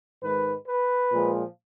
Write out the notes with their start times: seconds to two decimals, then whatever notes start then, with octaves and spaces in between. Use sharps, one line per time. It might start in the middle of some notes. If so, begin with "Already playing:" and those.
0.22 G#2 D#3 G#3 B4
0.67 B4
1.13 A#2 F3 G#3